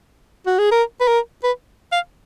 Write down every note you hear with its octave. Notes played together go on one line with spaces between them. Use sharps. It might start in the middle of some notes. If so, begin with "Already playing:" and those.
F#4
G#4
A#4
B4
A#4
B4
F5